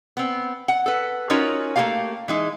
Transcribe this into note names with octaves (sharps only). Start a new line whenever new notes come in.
B3 C4
F#5
A4 B4
C#4 D#4 F4 F#4 A#4 C#5
A3 A#3 C#4 F4 G4 F5
E3 G#3 D#4